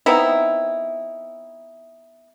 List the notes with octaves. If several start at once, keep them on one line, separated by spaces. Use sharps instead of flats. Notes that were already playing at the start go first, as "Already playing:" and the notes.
B3 C4 D#4 E4